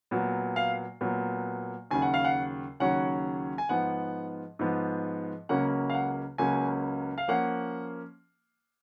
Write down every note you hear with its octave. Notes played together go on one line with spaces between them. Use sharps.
A#2 F#3 B3
F5
A#2 F#3 B3
D#2 C#3 F#3 C#4 G#5
F#5
F5
F#5
D#2 C#3 F#3 C#4 F#5
G#5
G#2 F3 B3 F#5
G#2 F3 B3
C#2 C#3 F#3 A#3 C#4 F#5
F5
F#5
C#2 C#3 F#3 A#3 C#4 G#5
F5
F3 A#3 C#4 F#5